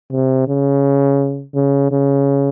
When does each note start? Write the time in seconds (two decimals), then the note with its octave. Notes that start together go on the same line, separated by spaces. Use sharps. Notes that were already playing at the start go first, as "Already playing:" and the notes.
0.11 C3
0.48 C#3
1.55 C#3
1.92 C#3